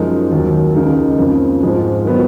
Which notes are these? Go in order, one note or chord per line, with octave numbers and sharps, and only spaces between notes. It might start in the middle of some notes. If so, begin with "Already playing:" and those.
Already playing: F#2 F3 G#3 D#4 A#4
D#2 D#3 F#3
C#2 C#3 G#3 D#4 A#4
F2 C#3 F3 A#3
G#2 F3 G#3
D#3 F#3 B3 F4